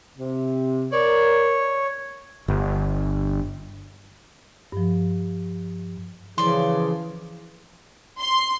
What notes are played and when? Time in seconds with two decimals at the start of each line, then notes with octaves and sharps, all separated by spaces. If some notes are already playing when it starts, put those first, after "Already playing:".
0.17 C3
0.92 A#4 C#5 D5
2.48 G1
4.72 G2 F3
6.38 C#3 E3 F3 D5 C6
8.20 C6